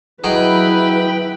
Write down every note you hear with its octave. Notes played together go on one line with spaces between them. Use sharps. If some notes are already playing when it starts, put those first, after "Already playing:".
F#3 E4 G#4 B4 D#5 G5 B5